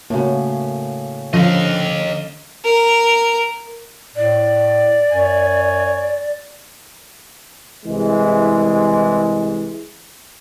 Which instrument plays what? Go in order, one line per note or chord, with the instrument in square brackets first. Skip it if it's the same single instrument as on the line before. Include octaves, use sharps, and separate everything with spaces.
[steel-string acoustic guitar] A2 C#3 [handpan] A#3 F#4
[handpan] D3 C#4 A4 [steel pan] F3 [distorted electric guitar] D#5 F5
[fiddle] A#4
[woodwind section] A2 [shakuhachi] D5
[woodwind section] F#2 C#5 G#5
[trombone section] C2 E3 G#3